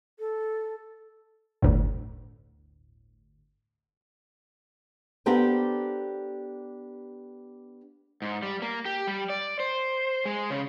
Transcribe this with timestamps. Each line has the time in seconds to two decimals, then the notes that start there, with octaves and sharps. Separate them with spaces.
0.19 A4
1.62 G1 D2 A2
5.26 B3 D4 G4 A4 A#4 C5
8.22 G#2
8.43 G3
8.62 A#3
8.85 G4
9.07 G3
9.30 D5
9.60 C5
10.26 G#3
10.50 C#3